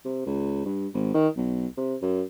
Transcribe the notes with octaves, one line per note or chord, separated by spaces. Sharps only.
C3
C#2
G2
G#1
D#3
B1
C3
F#2